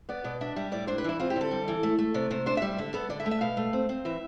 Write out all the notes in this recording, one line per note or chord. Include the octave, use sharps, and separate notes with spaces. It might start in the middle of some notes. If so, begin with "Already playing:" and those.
B3 D5
B2 D5
D4 E5
G3 E5
A2 D5
D4 C5
B4
E3 E4
C4 F4
G4
D3
A4
G3
E3
A3
A3
C3 D5
C3 C5
D4 C5
E5
G3
D3 E5
B3 A4
D3 D5
E5
A3
E5
B2 F5
A3
C4
C4
E3 E5